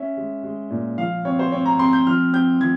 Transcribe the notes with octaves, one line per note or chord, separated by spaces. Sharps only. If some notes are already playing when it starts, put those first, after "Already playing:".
Already playing: C#4 E5
G#3
G#3
A#2
F3 F5
C4 C#5
C5
C4 C#5
A#5
C4 C6
G6
F3 F6
C4 G6
F3 G#6